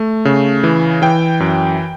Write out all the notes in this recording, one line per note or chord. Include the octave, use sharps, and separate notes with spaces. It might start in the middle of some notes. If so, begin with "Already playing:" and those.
Already playing: A3
C#3
E3
E3 G5
F#2